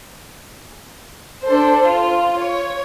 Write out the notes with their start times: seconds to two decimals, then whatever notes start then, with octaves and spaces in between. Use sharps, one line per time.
1.44 D4 A4 C5
1.85 F4
2.36 C#5